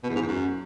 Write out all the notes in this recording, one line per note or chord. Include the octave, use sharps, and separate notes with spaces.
B2
E2
G#2
E2
F#2